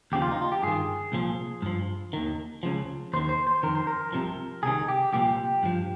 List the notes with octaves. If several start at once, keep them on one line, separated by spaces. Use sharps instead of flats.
D#2 C#3 F3 G4
F4
D#4
F4
G4
G2 D#3 G#4
C2 A#2 F3
G2 F3
D#2 D#3
C#2 C#3 F3
D#2 D#3 C5
C5
C5
F2 D#3 A#4
C5
A#4
C2 C3 F3
C2 C3 D#3 G#4
G4
C2 A#2 F3 G4
G2 F3